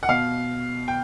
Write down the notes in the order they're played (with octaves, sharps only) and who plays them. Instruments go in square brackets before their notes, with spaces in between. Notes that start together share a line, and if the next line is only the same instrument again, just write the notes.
[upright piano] F#5
B2 F5
G5